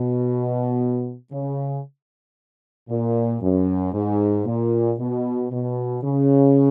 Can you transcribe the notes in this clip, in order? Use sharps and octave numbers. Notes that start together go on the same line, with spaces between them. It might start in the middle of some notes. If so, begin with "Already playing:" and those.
Already playing: B2
C#3
A#2
F#2
G#2
A#2
B2
B2
C#3